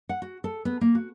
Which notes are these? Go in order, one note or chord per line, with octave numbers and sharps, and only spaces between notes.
F#5
F#4
A4
B3
A#3
F#4